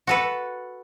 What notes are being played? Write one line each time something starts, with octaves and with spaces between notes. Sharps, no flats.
F#4 A4 B4